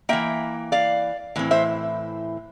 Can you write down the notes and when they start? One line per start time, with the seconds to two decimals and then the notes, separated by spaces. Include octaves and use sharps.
0.09 E3 A#3 E5 G5
0.72 D5 F5
1.36 A2 E3 C4
1.51 C5 E5